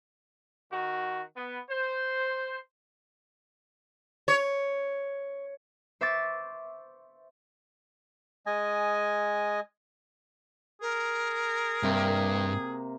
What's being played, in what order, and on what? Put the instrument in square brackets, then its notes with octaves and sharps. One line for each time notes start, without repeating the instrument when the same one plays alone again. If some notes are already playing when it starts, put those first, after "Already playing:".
[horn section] D#3 F#4
B3
C5
[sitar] C#5
[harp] C5 E5 C#6 D6 E6 A6
[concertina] G#3 D#5 G#5
[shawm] G#4 [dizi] A#4
[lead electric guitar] G2 [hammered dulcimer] C3 A#3